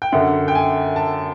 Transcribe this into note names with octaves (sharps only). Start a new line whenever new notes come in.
G5
F#2 D3 F#5
G5
G#5
A5